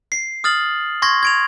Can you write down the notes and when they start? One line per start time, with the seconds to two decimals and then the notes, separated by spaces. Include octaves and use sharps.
0.12 C7
0.44 D#6 F6 A6 F#7
1.02 C6 C#6 G#6 A#6
1.23 G#6 D7 F7